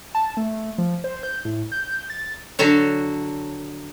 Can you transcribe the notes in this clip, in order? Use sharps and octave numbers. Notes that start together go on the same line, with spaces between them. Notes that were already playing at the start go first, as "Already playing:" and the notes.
A5
A3
F3
C5
G6
A2
G6
A6
D3 F#3 F#4 A4 C#5